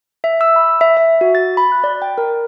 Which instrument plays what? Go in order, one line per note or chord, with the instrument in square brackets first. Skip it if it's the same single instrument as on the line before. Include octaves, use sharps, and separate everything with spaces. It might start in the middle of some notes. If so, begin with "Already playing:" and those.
[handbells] E5
E6
B5
E5
E5
F#4
A6
B5
F#6
D5
G5
A#4